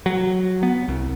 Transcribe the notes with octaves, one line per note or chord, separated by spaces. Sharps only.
F#3
B3
C2